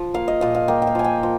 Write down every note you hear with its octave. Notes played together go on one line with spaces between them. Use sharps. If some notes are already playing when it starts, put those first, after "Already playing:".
Already playing: F3
A#3 F5
D#5
A#2 F5
F5
A#3 G5
G5
F5
F3 G#5
G5
F3